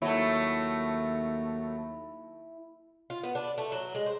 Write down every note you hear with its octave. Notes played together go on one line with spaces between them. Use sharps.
D#2 F#3 A3 E4
F4
B3
D4
A3
F#3
G#3
C5